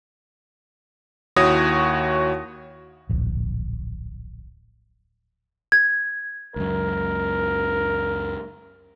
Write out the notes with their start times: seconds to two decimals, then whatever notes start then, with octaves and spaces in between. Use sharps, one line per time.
1.36 D#2 E4 F#4 C#5 D#6 A#6
3.10 D1 A#1
5.72 G#6
6.56 C#2 F#2 A#4